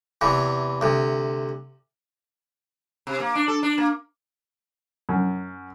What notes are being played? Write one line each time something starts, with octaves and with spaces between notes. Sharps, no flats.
E2 C3 E3
D2 C3
C3
A#3
D4
A4
D4
A#3
F#2